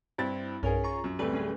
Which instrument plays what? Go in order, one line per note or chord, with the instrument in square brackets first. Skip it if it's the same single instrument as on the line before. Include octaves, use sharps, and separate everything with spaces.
[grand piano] G2 C4 A6 [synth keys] E4
[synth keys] B1 G2 A#4 [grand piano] C#4 G#4
[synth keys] F4 A#5 C#6
[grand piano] F#2
[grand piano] D1 G3 A3 [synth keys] C4 B4
[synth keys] C#4 G#4 B4